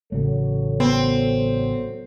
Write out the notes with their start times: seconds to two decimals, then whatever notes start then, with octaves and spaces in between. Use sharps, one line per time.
0.12 A1 C#3 F#3 A3 A4 C#5
0.80 B3 C4